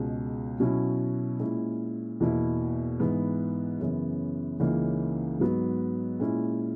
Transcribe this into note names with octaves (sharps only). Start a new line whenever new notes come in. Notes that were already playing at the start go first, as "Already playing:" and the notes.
Already playing: C#2 B2 G#3
B2 F#3 C#4 E4
A#2 G#3 C#4 E4
E2 B2 A#3 E4
G#2 E3 B3
F#2 C#3 E3 B3
C#2 C#3 E3 A#3 D#4
G#2 F#3 B3
A#2 G#3 C#4 E4